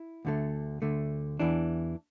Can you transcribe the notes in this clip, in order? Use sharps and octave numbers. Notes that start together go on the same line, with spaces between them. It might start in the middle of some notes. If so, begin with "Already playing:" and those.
Already playing: E4
D2 D3 A3
D2 D3 A3
E2 E3 D4